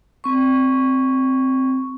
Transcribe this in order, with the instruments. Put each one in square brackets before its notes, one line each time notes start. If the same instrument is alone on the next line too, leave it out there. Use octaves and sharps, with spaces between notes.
[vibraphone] C4 C#6